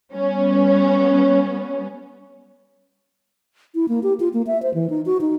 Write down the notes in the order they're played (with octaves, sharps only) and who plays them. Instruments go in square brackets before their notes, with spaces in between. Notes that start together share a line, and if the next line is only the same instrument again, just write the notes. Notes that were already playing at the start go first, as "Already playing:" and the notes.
[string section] G3 B3 C#4
[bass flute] E4
A#3
G4
F4
A#3
E5
C5
E3
D#4
F#4
D#4